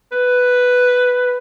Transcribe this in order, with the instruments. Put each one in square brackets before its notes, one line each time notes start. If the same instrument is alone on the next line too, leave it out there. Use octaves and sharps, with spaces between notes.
[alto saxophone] B4